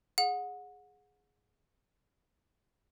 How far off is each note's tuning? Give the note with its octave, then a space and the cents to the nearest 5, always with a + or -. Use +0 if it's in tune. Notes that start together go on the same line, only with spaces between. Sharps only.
G#4 +0 F#5 -30